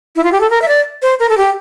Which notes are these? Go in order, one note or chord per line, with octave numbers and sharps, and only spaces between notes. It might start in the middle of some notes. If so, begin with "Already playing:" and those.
E4
F4
G4
A4
A#4
E5
D5
C5
A#4
A4
G4